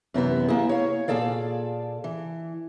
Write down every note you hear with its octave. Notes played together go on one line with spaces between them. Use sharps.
F#2 C3 E3 B3
A#3 E4 G#4
C#5 F5
A#2 G#4 A4 D5 F5
E3